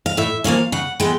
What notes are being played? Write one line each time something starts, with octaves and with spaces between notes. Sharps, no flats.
F5
A2 E5
F3 A#3 C#4 F5
C#3 F#5
E3 G#3 B3 G5